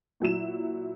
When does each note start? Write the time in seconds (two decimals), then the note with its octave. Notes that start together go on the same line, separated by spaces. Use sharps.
0.20 A#2 F#3 E4 E7